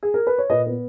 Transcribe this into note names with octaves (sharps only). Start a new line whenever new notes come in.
G#4
A#4
B4
C#5
A#2 B4 D#5
B3